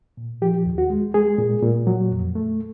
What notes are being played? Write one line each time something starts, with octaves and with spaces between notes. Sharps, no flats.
A#2
F3 G4
D#2
F#4
G#3
G#3 G#4
A#2
A#2
F#3
F2
A3